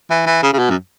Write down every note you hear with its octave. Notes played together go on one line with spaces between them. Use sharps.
E3
E3
C#3
C#3
B2
F#2